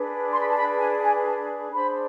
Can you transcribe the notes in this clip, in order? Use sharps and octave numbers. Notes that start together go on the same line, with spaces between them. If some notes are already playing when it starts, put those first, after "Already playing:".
Already playing: D4 G#4 B4
C6
B5
A5
B5
G#5
G#5
A5
D4 G#4 C5 B5